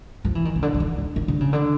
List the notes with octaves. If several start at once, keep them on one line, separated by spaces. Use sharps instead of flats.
F3
E3
D#3
C#3
D3
E3
D#3
D3
D#3
D3
C#3
D3